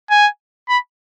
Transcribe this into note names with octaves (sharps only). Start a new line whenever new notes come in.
G#5
B5